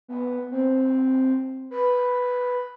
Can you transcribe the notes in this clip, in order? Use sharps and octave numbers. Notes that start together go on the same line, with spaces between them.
B3
C4
B4